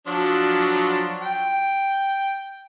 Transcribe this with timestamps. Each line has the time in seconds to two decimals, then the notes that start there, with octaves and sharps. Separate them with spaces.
0.07 F3 F#3 D4
1.22 G5